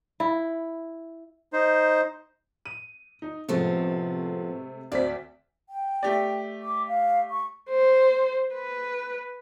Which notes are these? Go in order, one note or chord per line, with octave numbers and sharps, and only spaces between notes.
E4
D#4 C5
D#7
D#4
A2 C3 F3 G#3 A3 B3
D2 C4 D5 B6
G5
A3 G4 D5
D6
F5
C#6
C5
B4